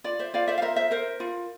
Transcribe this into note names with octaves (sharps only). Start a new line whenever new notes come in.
F4 D5
C5 E5
F4 D5 F5
C5 E5
F5
A#4 C5 E5
C5 E5
A#4 C5
F4